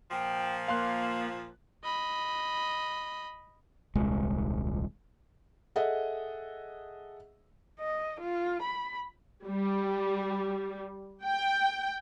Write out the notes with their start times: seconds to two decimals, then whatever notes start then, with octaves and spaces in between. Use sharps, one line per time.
0.11 A#2 F3 G5
0.68 A#3 F5 C6 F#6
1.84 D#5 B5
3.95 D#1 C2 G#3
5.76 G#4 A4 D#5 E5 F#5
7.80 D#5
8.21 F4
8.62 B5
9.44 G3
11.25 G5